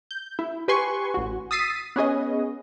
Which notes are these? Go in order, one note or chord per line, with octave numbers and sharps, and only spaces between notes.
G6
E4
G4 B4 G#5 C6 C#6
A1 F#4
D#6 E6 A6 B6 C7 D#7
B3 C#4 G#4 D#5